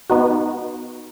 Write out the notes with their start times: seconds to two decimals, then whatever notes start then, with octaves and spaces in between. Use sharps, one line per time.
0.10 B3 D#4 F#4